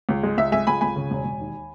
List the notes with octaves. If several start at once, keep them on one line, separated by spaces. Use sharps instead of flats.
C#2
G#3
C#2 E5
G#3 E5 G#5
C#2 G#5 B5
C#2 G#5 B5
C#3
E1
E1
D#2